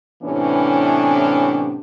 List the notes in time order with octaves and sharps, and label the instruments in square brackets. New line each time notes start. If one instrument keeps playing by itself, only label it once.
[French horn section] A2 C3 E3 B3 C#4 D4